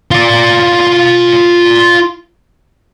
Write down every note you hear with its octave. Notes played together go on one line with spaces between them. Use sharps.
F4 D5